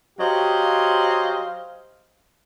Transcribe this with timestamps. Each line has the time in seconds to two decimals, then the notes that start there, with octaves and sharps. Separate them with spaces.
0.19 F#3 G4 C5 D#5 F5